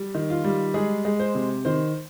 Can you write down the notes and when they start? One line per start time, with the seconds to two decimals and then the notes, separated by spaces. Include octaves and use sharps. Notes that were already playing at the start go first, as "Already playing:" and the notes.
Already playing: G3
0.15 D#3
0.30 F4
0.44 G3
0.74 G#3 G#4
1.05 G#3
1.20 C5
1.35 C3
1.65 D#3 C5